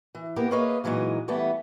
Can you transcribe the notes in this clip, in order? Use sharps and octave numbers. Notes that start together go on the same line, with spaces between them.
E3
A#3 B3 G4 A#4
A#3 G#4 B4 C#5 D#5 F5
A#2 E3 F#3 G#3 D#4
E3 G3 A3 B3 G4